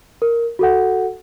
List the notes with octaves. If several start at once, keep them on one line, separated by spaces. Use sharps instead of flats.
A#4
F#4 A4 F#5